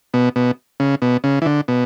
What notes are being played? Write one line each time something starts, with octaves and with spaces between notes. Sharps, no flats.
B2
B2
C#3
B2
C#3
E3
D3
B2